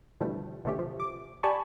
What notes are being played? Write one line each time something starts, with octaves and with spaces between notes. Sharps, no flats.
B2 D3 E3 F3 G3 A3
B2 D3 E3 A3 C#4 G4
F3
D6
G4 D5 G#5 A5 B5 C#6